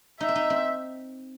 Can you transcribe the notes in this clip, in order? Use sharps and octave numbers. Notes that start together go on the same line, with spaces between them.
D#4 E5
C4
D#4
C4